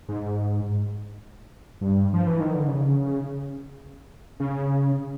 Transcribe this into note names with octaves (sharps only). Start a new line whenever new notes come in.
G#2
G2
F3
E3
D#3
D3
C#3
C#3